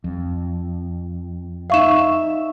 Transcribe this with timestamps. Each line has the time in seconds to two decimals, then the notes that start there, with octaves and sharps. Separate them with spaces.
0.04 F2
1.70 D#4 E5 F5 C#6 E7